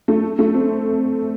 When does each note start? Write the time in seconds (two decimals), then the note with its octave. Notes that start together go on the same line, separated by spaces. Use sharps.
0.08 A3
0.39 A3
0.54 C4